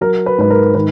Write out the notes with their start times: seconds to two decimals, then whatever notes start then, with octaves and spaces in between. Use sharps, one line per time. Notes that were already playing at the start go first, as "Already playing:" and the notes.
0.01 F#3 A#4
0.26 B4
0.38 G#2 B4
0.50 A#4
0.75 D#3 B4